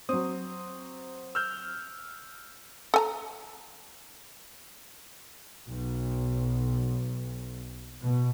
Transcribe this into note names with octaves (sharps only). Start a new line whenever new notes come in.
F#3 C4 D#6
E6 F6 G6
A4 G#5 A#5
B1
B2